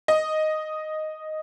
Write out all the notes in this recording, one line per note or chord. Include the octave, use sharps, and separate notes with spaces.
D#5